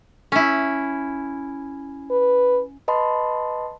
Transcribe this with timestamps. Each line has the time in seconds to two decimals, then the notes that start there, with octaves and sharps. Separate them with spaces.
0.32 C#4 E4
2.11 B4
2.88 B4 D#5 A5 B5 C6